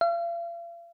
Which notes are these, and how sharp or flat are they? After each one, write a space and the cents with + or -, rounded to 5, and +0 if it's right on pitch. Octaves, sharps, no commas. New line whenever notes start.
F5 -40